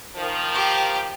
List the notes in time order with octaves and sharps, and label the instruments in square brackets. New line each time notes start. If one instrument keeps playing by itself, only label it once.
[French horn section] D#3 F3
[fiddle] G4